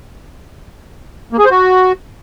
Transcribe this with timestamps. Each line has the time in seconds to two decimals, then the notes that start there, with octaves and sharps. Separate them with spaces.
1.33 A#3
1.39 G#4
1.45 C5
1.51 F#4